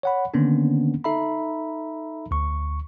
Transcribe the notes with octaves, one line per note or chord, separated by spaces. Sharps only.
C#5 F#5 B5
D3 D#3 A#3 B3 C#4 D4
D#4 A4 E5 A#5 B5
D2 C#6